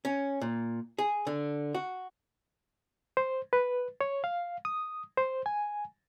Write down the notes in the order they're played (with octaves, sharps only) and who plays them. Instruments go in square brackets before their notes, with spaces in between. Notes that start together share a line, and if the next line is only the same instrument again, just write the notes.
[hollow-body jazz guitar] C#4
A#2
G#4
D3
F#4
[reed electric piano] C5
B4
C#5
F5
D#6
C5
G#5